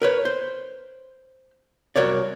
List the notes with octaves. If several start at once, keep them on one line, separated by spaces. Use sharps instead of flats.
A#4 B4 C#5
C5
C2 F#4 A#4 C#5 D5